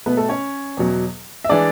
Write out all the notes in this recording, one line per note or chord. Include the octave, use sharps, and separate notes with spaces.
B2 A3 B3 B4
A3 A4
C#4 C#5
E2 B2 F#3
E5
E3 G#3 D4 D5